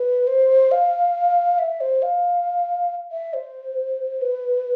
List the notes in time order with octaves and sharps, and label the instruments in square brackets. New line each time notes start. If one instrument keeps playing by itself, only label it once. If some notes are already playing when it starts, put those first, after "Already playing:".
Already playing: [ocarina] B4
C5
F5
E5
C5
F5
E5
C5
B4